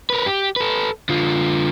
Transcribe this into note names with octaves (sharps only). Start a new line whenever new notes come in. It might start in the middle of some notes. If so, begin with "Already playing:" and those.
A#4 B4
G4
A4 B4
D3 F4